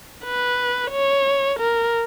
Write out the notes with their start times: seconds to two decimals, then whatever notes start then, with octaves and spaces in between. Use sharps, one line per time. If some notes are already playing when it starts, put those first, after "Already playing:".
0.25 B4
0.91 C#5
1.59 A#4